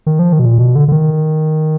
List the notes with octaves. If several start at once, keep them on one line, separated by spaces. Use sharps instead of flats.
D#3
F3
D#3
B2
A#2
B2
D3
D3
D#3